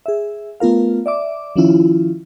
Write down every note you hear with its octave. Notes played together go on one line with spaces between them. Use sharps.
G#4 E5
A3 B3 F4 A#4 F5
D5 E5 D6
D#3 F3 C#4 E4 F4